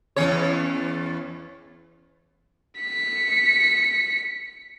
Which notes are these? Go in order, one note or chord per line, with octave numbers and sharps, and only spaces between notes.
E2 C#4 C#5
B6 C#7